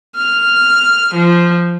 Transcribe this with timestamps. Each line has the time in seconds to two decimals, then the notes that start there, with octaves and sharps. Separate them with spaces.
0.15 F6
1.14 F3